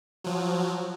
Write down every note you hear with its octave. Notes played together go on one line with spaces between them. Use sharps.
F3 F#3